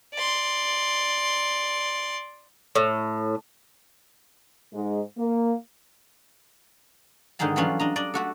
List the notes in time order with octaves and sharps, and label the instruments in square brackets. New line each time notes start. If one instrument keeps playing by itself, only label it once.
[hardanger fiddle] D5 C6
[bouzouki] A2
[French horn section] G#2 G#3
A#3
[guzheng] G#2 D3 D#3 D#4 G#4 A5
E3 F#3 G3 C#4 D4 F4
D4 D#5 A#5
D4 D5 D#5
A3 F#4 A4